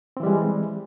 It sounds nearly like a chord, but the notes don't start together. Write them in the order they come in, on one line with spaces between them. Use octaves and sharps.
C4 E3 G3 G#3